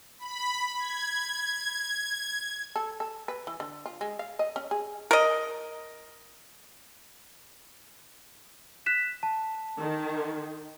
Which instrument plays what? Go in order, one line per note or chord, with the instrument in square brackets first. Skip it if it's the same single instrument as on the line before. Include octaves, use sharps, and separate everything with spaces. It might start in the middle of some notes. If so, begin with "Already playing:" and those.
[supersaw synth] B5
G#6
[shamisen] A4
A4
B4
E3
D3
F4
G#3
F5
D#5
C#4
G#4
[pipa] A#4 D#5
[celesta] F#6 B6 E7
A5
[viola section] D#3